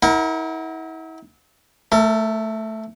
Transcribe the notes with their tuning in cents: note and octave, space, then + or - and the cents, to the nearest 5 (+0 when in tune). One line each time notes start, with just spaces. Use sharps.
E4 -40 A#4 +0 F#5 +0
A3 +0 A#4 -40